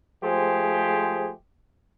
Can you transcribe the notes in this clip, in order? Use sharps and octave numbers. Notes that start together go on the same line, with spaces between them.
F3 G#3 A3 G4 G#4 C5